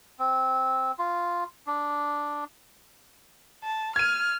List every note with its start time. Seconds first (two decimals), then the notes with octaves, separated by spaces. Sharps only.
0.19 C4
0.99 F4
1.67 D4
3.63 A5
3.96 F6 G#6 D#7